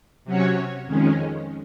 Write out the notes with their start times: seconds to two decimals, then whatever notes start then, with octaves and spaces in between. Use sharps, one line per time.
0.25 C3 F#3 C#4 F#4 C#5
0.87 F2 D#3 G#3 C#4